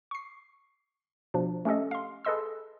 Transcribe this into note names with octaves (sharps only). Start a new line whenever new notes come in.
C#6 C7
B2 F3 D4
A3 C#4 G4 A4 D#5
F5 C6
G#4 A4 B4 D#5 C6 E6